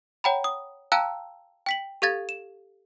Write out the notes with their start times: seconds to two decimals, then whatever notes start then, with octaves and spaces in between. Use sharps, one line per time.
0.24 C#5 F#5 G5 A#5 B5
0.44 D#6
0.92 F5 G5 A5 A#5 E6 F#6
1.66 G5 B6 F#7
2.02 G4 A4 F5 G#6 A6
2.29 E7